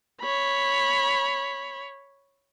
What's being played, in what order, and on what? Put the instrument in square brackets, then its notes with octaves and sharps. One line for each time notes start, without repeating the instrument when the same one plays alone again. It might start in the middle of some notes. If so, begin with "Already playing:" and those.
[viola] C#5 B5